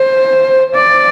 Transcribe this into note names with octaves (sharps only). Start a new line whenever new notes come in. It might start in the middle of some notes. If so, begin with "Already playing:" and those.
Already playing: C5
D5